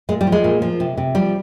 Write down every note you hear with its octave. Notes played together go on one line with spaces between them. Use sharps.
A#2 G#3
G3
F3
G#3
A#2
F3
C3
C3
F3 G3